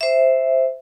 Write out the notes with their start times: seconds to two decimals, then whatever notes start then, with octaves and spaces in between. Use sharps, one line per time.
0.01 C5 E5